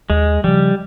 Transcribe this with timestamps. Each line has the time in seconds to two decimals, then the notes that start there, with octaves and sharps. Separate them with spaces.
0.10 D#2 G#3
0.44 C#3 F3 G3